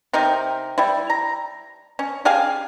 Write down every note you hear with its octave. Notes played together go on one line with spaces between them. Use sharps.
C3 D#4 G4 A#4
G3 E4
A#5
C#4
G4 G#4 F5 G#5